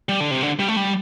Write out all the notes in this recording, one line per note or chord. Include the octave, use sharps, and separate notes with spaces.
G3
D3
C3
D3
G3
A3
G3